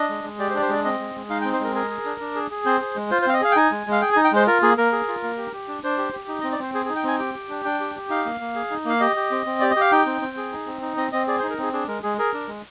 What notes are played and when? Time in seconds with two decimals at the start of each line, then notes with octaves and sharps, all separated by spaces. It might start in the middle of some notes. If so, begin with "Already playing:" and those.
Already playing: D4 D#5
0.09 G#3
0.24 G#3
0.39 G4 D5
0.50 C5
0.54 D4 D5
0.62 C5
0.69 G#3 D5
0.85 C4 D#5
0.99 G#3
1.15 G#3
1.30 D#4 F5
1.41 G5
1.45 C4
1.53 C5
1.60 G#3 A#4
1.75 G#4 A#4
1.90 G#4
2.05 D4
2.21 D4
2.35 G#4
2.51 G#4
2.66 C4 C5
2.81 G#4
2.96 G#3
3.11 F4 C5
3.22 C5
3.26 C4 F5
3.34 D#5
3.41 G#4 F5
3.52 G5
3.56 D#4 G#5
3.72 G#3
3.87 G#3 F5
4.01 G#4 G5
4.13 G#5
4.16 D#4
4.25 G5
4.32 G#3 C5
4.47 F4 A#4
4.62 A#3 G#4
4.78 A#3 A#4
4.92 G#4
5.08 F4
5.23 A#3
5.38 G4
5.53 G4
5.68 D4
5.84 D4 C5
5.98 G4
6.13 G4
6.28 D#4
6.41 D#5
6.44 C4
6.52 D5
6.59 C4 C5
6.74 G#4 C5
6.85 G#4
6.89 D#4
6.96 G5
7.04 C4 G#5
7.19 G4 G5
7.34 G4
7.49 D4
7.64 D4 G5
7.80 G4
7.95 G4
8.10 D#4 F5
8.25 A#3
8.40 A#3
8.55 G#4
8.71 D#4
8.85 A#3 F5
9.00 G4 D#5
9.16 G4
9.31 C4
9.46 C4
9.60 G4 D5
9.71 D#5
9.76 G4 F5
9.92 D#4 G5
10.06 C4
10.21 C4
10.37 G#4
10.52 D#4
10.67 C4
10.82 D#4
10.97 C4 D#5
11.12 C4 D#5
11.27 G#4 D5
11.39 C5
11.43 D#4
11.50 A#4
11.58 C4 G#4
11.73 D4 G#4
11.87 G#3 A#4
12.03 G#3 G#4
12.18 G#4 A#4
12.34 D4
12.48 G#3